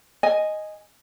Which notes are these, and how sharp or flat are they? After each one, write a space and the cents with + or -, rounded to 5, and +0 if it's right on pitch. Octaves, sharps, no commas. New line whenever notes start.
D#5 +0 G#5 +0